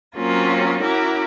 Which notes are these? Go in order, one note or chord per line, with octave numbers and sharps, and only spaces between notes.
F#3 A#3 C4 C#4 F4
C#4 E4 F#4 A#4 D6